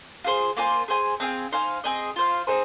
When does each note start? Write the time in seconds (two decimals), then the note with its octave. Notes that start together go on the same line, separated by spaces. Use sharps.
0.24 F4 G#4 C5
0.57 A#3 F4 C5 G#5
0.88 G#4 C5 G#5
1.20 C4 G#4 F5 G#5
1.52 D#4 C5 F5 G#5
1.84 C4 G#4 D#5
2.16 F4 C5 F5
2.47 C4 D#4 G#4 C5